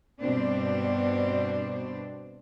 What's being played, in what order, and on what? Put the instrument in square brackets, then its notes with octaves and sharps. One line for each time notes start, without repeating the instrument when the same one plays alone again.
[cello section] G2 B2 C4 D4